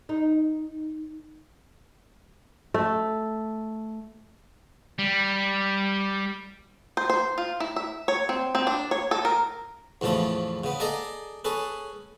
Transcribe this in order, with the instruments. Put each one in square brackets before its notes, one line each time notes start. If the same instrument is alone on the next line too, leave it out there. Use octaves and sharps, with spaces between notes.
[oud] D#4
[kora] A3
[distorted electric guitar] G3
[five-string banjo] C5
C5
F4
E4
E5
C#5
C4
C4
D4
C#5
A4
A#4
[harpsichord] E2 A2 C#3 F3 A4
C#3 B3
G#4 A4 D5 D#5 A#5
C#4 G#4 A4 B4